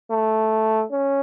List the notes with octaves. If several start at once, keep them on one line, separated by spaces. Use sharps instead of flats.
A3
C#4